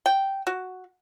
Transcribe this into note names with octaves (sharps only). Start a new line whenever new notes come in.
G5
F#4